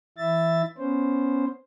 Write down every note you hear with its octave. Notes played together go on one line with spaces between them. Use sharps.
E3 E4 E5 A6
B3 C#4 C5